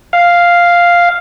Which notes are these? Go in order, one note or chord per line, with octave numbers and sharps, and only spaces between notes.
F5